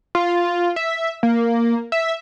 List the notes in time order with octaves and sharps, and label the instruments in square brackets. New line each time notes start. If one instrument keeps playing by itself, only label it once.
[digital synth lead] F4
E5
A#3
E5